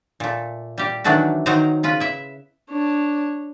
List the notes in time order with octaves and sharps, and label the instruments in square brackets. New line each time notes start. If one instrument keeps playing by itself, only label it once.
[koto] A#2 A3
G3 G4
D#3 E3 F#3 A3 D4 F#4
D#3 F#3 D#4 A#4 C5 A#5
C#3 F4 B4
E4 E5
[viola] D4 C#5